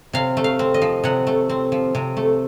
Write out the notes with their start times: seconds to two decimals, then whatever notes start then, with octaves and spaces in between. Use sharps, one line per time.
0.13 C3 F5
0.37 A3
0.44 F5
0.59 C4
0.74 D#5
0.82 F3
1.04 C3 F#5
1.27 A3
1.49 C4
1.72 F3
1.95 C3
2.17 A3